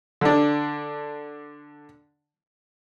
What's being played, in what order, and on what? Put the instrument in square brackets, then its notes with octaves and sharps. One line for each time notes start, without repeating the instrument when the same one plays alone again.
[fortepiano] D3 D4